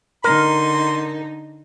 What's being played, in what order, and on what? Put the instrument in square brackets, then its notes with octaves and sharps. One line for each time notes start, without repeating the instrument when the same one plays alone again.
[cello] D3 D#4 [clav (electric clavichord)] A#4 [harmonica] C6